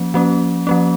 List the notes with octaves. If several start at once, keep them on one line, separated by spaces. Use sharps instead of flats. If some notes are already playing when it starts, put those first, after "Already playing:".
Already playing: F3 A#3 C#4
F3 A#3 C#4
F3 A#3 C#4